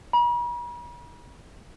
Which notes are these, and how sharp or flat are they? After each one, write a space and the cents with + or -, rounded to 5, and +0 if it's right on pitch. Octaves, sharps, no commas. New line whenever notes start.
B5 -45